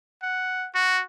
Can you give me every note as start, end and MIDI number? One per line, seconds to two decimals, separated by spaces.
0.22 0.67 78
0.75 1.02 66